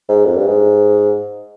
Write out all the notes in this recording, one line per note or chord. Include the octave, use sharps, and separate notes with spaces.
G#2
F2
G2
G#2